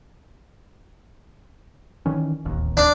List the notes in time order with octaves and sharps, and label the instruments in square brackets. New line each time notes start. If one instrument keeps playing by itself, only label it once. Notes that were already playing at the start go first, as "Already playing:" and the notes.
[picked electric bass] D#3 E3 C#4
D1 A1 D#2
[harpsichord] D4